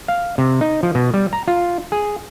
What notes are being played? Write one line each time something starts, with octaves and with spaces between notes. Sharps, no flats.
F5
C3
D#4
F3
B2
G3
A#5
F4
G#4